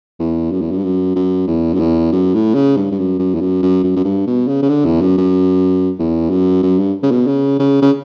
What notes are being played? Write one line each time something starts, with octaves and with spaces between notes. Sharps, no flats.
E2
F#2
E2
F#2
G2
F#2
F#2
E2
F#2
E2
F#2
A2
C#3
G2
G2
F#2
F#2
E2
F#2
F#2
F#2
F#2
G2
B2
C#3
C#3
D3
E2
F#2
F#2
E2
F#2
F#2
G2
C#3
B2
C#3
C#3
C#3